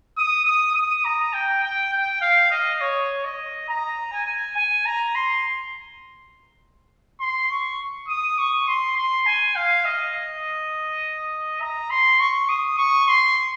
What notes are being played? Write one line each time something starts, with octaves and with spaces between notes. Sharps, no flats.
D#6
D#6
D#6
A#5
G5
G5
G5
F5
D#5
C#5
D#5
A#5
G#5
G#5
A#5
C6
C6
C#6
D#6
C#6
C6
C6
G#5
F5
D#5
A#5
C6
C#6
D#6
C#6
C6